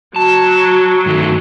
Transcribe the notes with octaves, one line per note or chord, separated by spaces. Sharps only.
F#3 A5
G2 D#3 A3